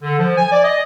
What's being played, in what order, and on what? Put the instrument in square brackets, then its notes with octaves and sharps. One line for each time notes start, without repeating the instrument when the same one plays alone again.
[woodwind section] D3
F3
G#5
D5
D#5